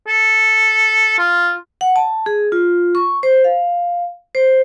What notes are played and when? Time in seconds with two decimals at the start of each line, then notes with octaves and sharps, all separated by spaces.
0.08 A4
1.18 F4
1.81 F#5
1.96 A5
2.26 G#4
2.52 F4
2.95 C#6
3.23 C5
3.44 F5
4.35 C5